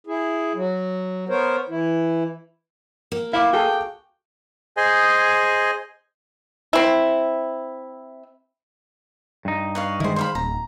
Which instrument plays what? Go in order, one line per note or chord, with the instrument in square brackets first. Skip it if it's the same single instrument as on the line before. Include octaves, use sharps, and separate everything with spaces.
[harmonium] E4 G#4
F#3
B3 A#4 C5 C#5
E3 E4
[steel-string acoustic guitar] A#3
[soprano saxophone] E4 [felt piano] F5 D6
[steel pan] F#4 G#4 A4 [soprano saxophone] G5
[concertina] G#4 C5 D#5 G#5
[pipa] C4 E4
[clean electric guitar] G2 D#4
[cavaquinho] B4 C#5 F5
[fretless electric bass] D#3 G#3 [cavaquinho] E4 C5
[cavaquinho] C5 F5 B5
[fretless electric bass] D1 [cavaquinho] A#5